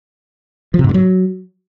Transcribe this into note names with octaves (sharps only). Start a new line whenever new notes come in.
F3
C3
G#2
G2
F#3